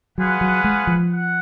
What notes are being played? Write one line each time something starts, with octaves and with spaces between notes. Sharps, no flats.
F#3 F4 G#4 B4 F#5
F#3
G#3
F3
F#5